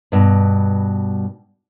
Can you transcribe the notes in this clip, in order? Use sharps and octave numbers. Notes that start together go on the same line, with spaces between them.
G2 B2